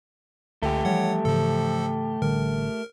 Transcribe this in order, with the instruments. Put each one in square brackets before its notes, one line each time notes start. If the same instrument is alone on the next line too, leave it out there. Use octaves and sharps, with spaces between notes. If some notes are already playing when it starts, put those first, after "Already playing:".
[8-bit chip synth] C#2 D3 [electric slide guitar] A3 G4
[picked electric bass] E3 F3 G3 [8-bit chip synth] C#5 F#5
[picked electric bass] G#2 C#3 E3 [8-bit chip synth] F3 A4
[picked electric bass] A1 D3 G3 [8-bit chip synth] A#4